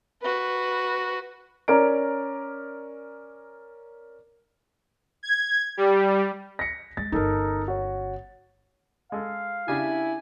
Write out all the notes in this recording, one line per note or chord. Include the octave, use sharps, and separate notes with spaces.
F#4 B4
C#4 A#4 D5 A#5 D7
G#6
G3
A#6 B6 C#7
G#3 A6
G1 C#4 D#4 A4 A#4
F#4 C#5
G#3 A4 F5
C#3 D4 E4 G4 G#5